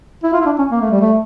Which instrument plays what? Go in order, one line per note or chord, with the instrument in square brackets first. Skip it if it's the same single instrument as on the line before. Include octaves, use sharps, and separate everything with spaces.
[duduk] E4
F4
E4
D4
C#4
A#3
A3
G3
A3